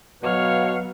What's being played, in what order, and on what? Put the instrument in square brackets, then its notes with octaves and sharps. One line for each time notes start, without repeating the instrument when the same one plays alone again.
[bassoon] B2 [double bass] F#3 B3 [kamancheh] C#5 F6 [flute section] F5 F#5